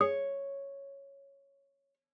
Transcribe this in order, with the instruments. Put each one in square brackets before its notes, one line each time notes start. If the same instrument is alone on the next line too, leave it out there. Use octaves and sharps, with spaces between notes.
[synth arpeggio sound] G#4 [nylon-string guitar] C#5